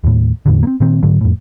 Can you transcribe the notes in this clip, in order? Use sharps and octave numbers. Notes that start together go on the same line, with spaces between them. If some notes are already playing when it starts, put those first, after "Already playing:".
D#2 A2
E2 A2 D3
A#3 C4
A#2 D#3 C4
G#2 D3 F#3
F2 A2